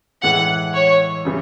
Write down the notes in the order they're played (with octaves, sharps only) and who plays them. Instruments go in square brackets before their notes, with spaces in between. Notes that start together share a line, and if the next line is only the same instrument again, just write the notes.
[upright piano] A2 E3 G#3 [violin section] F#5
[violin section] C#5
[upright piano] C#3 E3 G3 C4